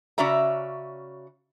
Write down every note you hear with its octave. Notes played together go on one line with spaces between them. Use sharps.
C#3 C#4 F#4 D5 E5 A#5